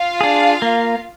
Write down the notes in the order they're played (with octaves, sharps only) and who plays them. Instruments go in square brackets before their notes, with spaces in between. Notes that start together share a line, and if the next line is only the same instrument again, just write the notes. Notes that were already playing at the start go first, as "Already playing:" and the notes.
Already playing: [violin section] F4 F5
[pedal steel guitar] D4 G#4
A#3